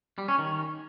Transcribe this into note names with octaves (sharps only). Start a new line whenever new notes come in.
G3
C#4
D#3